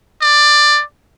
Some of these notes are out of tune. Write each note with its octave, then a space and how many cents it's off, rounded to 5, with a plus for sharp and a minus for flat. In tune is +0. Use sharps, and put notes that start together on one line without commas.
D5 +15